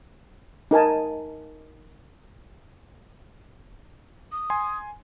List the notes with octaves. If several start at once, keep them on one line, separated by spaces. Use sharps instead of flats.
D#4 A#4 G#5 A5
D#6
G#5 C6